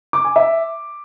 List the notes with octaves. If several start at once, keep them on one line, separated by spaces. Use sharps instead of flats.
D6
G#5
E5